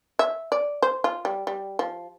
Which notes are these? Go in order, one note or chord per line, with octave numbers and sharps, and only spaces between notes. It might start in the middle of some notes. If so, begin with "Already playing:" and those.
E5
D5
C5
F4
G3
G3
F3